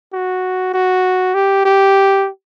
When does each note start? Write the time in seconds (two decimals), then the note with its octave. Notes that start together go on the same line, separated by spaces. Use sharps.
0.13 F#4
0.74 F#4
1.34 G4
1.65 G4